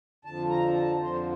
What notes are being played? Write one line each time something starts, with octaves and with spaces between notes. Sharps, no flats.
F2 D3 F3 A5
A#5
A5
F2 D3 F3 C5